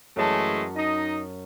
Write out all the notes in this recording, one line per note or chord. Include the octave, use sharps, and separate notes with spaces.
F#2 E3 G#3 A3 A5
D#4 D#5